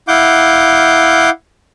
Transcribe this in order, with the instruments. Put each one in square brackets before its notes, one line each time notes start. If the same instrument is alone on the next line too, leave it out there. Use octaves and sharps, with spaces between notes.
[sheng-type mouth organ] E4 F5 F#5 D6 G6